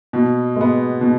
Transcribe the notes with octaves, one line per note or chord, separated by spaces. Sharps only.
B2
G#3 B3
B2